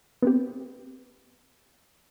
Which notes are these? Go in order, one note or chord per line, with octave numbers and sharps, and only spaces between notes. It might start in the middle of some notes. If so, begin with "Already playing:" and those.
B3 C4 G4